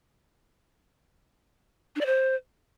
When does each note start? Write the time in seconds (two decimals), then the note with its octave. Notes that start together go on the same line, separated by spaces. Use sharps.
1.96 D4
2.01 D5
2.06 C5